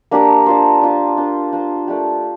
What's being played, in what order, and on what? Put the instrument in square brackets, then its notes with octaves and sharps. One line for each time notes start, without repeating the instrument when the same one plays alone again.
[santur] A#3 D4 G4 A#4
D4 F4 C5
D4 F4 C5
D4 F4 C5
D4 F4 C5
A3 D4 G4